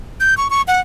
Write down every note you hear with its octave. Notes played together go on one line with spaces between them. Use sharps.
G6
C#6
C#6
F#5